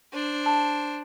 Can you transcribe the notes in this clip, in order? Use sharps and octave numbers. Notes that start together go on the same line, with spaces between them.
D4 C5
A5